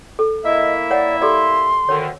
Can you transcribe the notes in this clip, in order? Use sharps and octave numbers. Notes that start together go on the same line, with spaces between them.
A4
A#3 E4 D#5 E5
C#5 D5 F#5 A#5
G4 A4 D5 C6
D2 D3 D#3 C#5